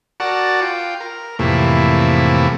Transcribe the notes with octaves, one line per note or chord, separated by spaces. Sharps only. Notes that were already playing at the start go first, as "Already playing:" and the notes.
F#4 A#4 D5 F#5 A5
F4 G5
A#4
F2 A2 C3 E3 A3 A#3